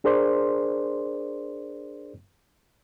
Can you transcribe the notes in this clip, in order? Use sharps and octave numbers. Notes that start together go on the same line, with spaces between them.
D4 G#4 A#4 C5 D5 C6